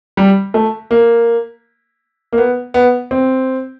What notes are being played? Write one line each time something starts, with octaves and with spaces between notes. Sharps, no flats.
G3
A3
A#3
A#3
B3
B3
C4